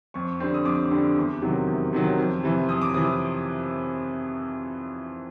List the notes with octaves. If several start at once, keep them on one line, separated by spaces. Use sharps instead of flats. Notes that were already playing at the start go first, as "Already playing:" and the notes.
F2 C#6
D3 G3 C4
D#6
F2 D6
D3 G3 C4
E2
C3 D#3 F#3
E2
C3 D#3 F#3
F2
C3 E3
F2 D#6
D6
C3 E3 D#6